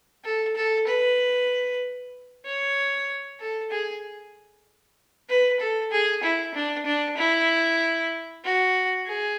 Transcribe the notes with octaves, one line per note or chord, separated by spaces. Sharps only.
A4
A4
B4
C#5
A4
G#4
B4
A4
G#4
E4
D4
D4
E4
F#4
G#4